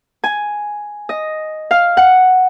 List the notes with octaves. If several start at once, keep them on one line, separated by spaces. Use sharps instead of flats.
G#5
D#5
F5
F#5